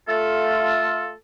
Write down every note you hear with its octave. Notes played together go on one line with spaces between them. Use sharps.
A3 F4 A4